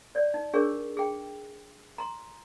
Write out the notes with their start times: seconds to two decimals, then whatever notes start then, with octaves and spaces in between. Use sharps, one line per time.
0.15 C#5 D5
0.34 D#4
0.54 D4 G#4 A#4 C#5 C#6 E6
0.97 G#4 G5
1.98 A#5 C6